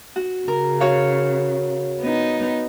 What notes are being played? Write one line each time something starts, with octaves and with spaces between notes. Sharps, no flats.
F#4
C#3 A#4
F#4 C#5 F5
B3 D#4